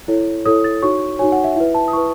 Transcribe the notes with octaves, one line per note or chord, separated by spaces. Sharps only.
E4 A4 C#5
E4 A4 C#5 D#6
A6
D#4 F#4 C#5 C#6
D#4 F#4 C#5 G#5
F#5
E5
E4 B4 E5
A5
D#6
E4 B4 C#6